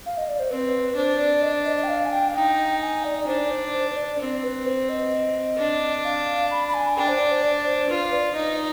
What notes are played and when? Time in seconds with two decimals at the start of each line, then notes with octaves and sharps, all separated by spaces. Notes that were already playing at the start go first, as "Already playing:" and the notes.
0.06 F5
0.18 D#5
0.28 D5
0.40 C5
0.50 C4 B4
0.96 D4 C5
1.19 D5
1.42 D#5
1.65 D#5
1.77 D#5
1.84 G5
1.88 F5
2.05 G#5
2.11 G5
2.29 F5
2.35 D#4 G5
2.81 G#5
3.04 D5
3.18 D5
3.27 D4 C5
3.38 D5
3.50 C5
3.73 C5
3.90 C5
3.97 D5
4.19 C4
4.43 B4
4.66 C5
4.89 D#5
5.58 D4
6.04 F5
6.51 B5
6.68 B5
6.74 G#5
6.97 D4 G5
7.08 C5
7.20 D5
7.31 C5
7.43 D5
7.66 C5
7.90 F4 B4
8.13 D5
8.35 D#4 D#5